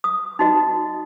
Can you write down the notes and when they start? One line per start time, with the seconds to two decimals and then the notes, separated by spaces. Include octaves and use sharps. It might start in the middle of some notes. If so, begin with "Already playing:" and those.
0.04 D#6
0.39 D#4 F#4 D#5